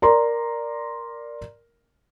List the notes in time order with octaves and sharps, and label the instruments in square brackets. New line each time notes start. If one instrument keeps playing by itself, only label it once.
[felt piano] A#4 D5 A#5 C6